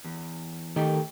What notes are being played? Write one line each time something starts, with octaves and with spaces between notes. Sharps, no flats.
E2
D#3 A3 G4